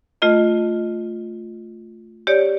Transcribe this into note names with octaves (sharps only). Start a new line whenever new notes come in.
A3 F4 D#5
G4 C#5 D5